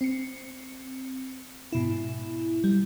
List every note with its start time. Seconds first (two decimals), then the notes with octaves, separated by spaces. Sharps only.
0.01 C4 C#7
1.72 G#2 B2 E4
2.64 G3